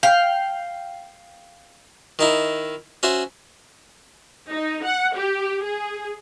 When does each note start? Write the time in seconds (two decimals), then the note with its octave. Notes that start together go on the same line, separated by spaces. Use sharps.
0.03 F5 G5
2.19 D#3 D#4 E4
3.03 C#4 F#4 C5 E5
4.50 D#4
4.84 F#5
5.15 G4
5.64 G#4